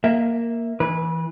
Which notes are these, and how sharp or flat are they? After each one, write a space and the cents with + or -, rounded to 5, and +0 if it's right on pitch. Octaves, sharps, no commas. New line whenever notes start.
A#3 +0 E5 +0
E3 +0 B4 -25